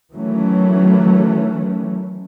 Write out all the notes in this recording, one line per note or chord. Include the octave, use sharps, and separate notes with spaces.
D#3 E3 F#3 A3 C#4